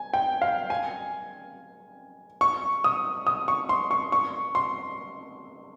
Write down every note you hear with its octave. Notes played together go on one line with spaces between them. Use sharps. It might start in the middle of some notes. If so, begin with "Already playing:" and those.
Already playing: G#5
G5
F5
G#5
C#6
D#6
D#6
C#6
C6
C#6
C#6
C6